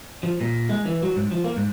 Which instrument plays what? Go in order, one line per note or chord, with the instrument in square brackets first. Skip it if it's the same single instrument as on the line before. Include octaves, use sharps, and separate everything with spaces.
[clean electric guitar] F3
A#2
G#3
E3
F#3
G#2
F3
A#3
G#2